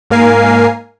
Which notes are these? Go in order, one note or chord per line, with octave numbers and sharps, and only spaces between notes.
G#2 A#3 A#4 F5 G#5 C7